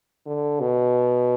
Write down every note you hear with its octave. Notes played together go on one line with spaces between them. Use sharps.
D3
B2